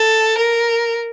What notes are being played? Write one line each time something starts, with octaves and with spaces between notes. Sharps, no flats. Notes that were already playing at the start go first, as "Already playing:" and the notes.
Already playing: A4
A#4